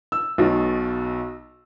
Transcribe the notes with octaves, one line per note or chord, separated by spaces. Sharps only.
E6
B1 B2